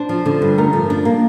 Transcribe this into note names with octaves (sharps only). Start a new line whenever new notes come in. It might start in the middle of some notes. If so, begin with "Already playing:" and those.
Already playing: D4 C5
F3
D3
G2
A3 A#4
F3
D4
A#3